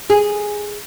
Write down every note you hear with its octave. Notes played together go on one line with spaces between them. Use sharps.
G#4